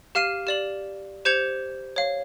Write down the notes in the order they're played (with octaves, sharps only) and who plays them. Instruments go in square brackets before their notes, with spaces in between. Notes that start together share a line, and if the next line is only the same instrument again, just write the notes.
[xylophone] G4 F5 F6 C7 D#7
G4 D5 F#7
G4 C5 G6 G#6 C#7 F7
C#5 F5